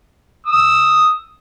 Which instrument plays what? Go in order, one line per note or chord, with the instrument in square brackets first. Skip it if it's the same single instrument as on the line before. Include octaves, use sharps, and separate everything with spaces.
[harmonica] D#6 E6